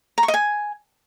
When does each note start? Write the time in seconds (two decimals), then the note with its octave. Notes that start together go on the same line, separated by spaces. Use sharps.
0.18 A#5
0.23 C#6
0.28 D#5
0.34 G#5